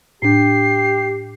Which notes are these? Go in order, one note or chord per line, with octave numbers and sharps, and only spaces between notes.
A2 D4 G4 C7